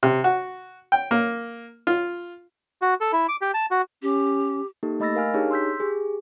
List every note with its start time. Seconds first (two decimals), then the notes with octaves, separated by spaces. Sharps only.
0.03 C3
0.24 F#4
0.92 G5
1.11 A#3
1.87 F4
2.82 F#4
3.01 A4
3.13 E4
3.28 D6
3.41 G4
3.54 A5
3.71 F#4
4.02 C#4 G4
4.83 A#3 D#4 G4 A4
5.00 A3 D#5 B5 E6 A6 A#6
5.15 A#4 F5 G#5 F6
5.34 D4 D#4 G4 G#4 C#5
5.51 C6 E6 G6 B6
5.80 G4 G#4